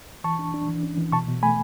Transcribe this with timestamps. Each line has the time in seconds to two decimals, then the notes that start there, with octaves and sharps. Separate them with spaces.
0.24 E3 A5 C#6
0.39 D4
0.54 D4
0.68 E3
0.83 C#4
0.98 E3
1.12 B2 A5 C#6
1.28 B2
1.43 A3 G#5 B5